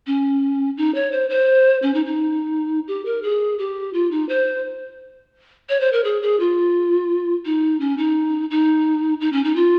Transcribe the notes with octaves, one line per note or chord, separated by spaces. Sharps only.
C#4
D#4
C#5
C5
C5
C#4
D#4
D#4
G4
A#4
G#4
G4
F4
D#4
C5
C#5
C5
A#4
G#4
G#4
F4
D#4
C#4
D#4
D#4
D#4
C#4
D#4
F4